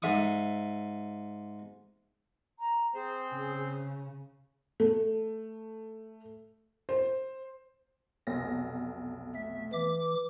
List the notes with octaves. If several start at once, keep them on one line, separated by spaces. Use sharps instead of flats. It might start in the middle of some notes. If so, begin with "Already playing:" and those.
G#2 E5 C#6 D#6
A#5
C4 G#4 C5
C#3
A3
C5
F1 B1 A#6
A3 E5
E3 D6